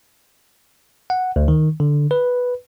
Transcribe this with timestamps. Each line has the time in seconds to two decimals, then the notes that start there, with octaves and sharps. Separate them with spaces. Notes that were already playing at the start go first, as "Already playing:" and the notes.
1.10 F#5
1.36 D2
1.48 D#3
1.80 D3
2.11 B4